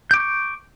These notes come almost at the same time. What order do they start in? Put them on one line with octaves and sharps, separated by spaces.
G6 D6 C#6